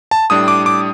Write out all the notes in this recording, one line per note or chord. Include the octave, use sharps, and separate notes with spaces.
A5
A2 G3 D4 D#6
D6
D6